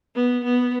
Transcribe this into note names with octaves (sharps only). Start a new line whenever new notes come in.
B3
B3